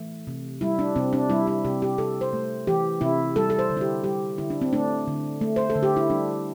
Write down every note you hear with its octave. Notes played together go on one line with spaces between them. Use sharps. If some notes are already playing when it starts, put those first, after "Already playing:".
Already playing: E3 A3
C3
G3 E4
D4
C3 C4
D4
G3 E4
E4
C3 G4
G4
C3 A4
C5
A3
E3 G4
C3 E4
G3 A4
A4
C5
D3
E4
G4
G3 G4
D3 E4
D4
C4
A3 D4
D3
A3
C5
A4
D3
G4
E4
G3 D4